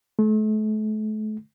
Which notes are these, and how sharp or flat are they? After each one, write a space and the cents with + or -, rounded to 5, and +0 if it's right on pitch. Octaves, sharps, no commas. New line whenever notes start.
A3 -35